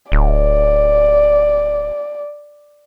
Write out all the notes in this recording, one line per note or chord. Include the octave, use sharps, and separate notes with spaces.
D1 D5